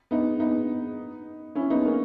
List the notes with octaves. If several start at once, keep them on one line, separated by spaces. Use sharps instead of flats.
B3 D#4
B3 D#4
C#4 E4
B3 D#4
A#3 C#4